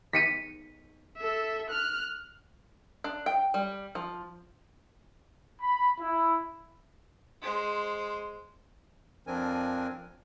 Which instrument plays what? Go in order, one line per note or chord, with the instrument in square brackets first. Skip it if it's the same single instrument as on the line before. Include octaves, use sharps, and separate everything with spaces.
[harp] B6 C#7 D#7
[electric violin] A4 E5
F6 F#6
[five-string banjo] D4
G5
G3
F3
[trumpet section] B5
E4
[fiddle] G#3 C5
[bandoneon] F2 F3 C4 D4 A#4 G#5